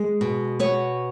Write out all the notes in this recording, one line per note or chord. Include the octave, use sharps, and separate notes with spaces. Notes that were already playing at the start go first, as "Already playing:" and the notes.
Already playing: G#3
B2
B3 C#5